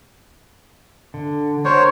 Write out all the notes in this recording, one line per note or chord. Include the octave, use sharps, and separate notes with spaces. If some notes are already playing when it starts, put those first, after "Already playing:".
D3
D4 F#4 A#4 C5 C#5